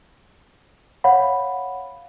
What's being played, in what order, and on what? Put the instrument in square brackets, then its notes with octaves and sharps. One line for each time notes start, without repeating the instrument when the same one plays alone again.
[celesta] C#5 F5 F#5 B5